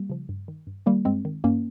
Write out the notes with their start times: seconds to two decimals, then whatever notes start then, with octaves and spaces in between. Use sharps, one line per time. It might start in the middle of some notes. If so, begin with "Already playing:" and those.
Already playing: G3 A#3
0.10 C#3 F3
0.29 G2
0.48 D#3
0.67 G2
0.86 D#3 G3 A#3
1.05 G2 G#3 C4
1.25 D#3
1.44 G2 A#3 C#4